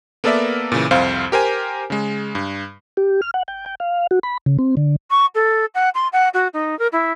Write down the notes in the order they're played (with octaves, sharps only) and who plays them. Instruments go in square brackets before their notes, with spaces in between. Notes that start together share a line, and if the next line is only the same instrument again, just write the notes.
[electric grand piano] A#3 B3 A4 A#4 D5 E5
A#2 C#3 E3
C2 F2 C4 C5 F5
G4 A#4 C5 G#5
C#3 G#3
G2
[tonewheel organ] G4
F6
F#5
G5
G5
F5
F#4
B5
C#3
C4
D3
[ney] C#6
A4
F#5
C6
F#5
F#4
D#4
A#4
E4